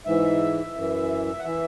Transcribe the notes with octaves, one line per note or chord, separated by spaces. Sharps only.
G#2 E3 E5
F#2 E3
F#5
E3 E5